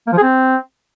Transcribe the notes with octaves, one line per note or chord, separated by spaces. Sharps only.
A#3
F3
G#4
C4